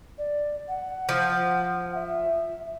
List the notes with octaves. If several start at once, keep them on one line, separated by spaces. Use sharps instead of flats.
D5
F#5
F3
E5